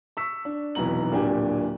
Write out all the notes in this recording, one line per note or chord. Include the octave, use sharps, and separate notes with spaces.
C#6 E6 B6
D4
F1 B1 E2 B2 A#5 F#7
D1 A#2 D4 G4 G5 G#5